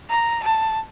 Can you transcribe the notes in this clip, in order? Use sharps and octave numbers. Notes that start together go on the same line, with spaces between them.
A#5
A5